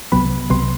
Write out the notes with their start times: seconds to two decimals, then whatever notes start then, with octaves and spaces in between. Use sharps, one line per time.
0.12 C2 C3 F#3 B3 B5
0.50 C2 C3 F#3 B3 C6